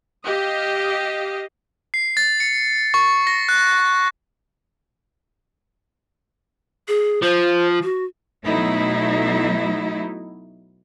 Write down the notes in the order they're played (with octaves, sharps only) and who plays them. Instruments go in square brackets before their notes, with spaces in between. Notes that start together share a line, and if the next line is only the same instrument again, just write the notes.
[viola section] G4 D#5 F5
[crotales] C7
A6
C#7
C#6
A#6
F#6
[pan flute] G#4
[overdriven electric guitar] F3 [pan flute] C5
[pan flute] F#4
[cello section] B2 F#3 A3 D#4 E4